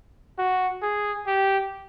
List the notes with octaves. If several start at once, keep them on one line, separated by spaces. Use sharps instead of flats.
F#4
G#4
G4